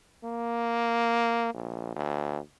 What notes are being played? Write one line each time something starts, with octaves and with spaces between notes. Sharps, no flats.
A#3
A#1
D2